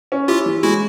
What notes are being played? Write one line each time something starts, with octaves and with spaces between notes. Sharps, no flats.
C#4
E4 F4 G4
E3
G#3 E4 F#4